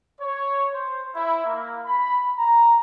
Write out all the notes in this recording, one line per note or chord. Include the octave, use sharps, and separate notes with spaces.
C#5
C5
E4
A#3
B5
A#5